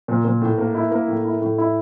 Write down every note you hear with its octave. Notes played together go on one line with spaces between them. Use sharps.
A#2
A#2
A2
A#3
E4
A#3
A2
E4
A2
E4